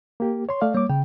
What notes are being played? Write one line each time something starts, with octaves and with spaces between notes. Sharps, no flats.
A#3 G4
C#5 C6
A3 D5 F5
G3 A#3 C#5 D6
C#3 G5